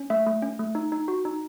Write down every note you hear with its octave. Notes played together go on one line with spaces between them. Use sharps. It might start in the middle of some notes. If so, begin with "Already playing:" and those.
Already playing: C#4
A3 E5
A3
C#4
A3
D#4
D#4
F#4
D#4